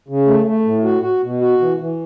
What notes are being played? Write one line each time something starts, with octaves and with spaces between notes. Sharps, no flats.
C#3
A3
A3
A2
F#4
F#4
B2
F#4
E3
E3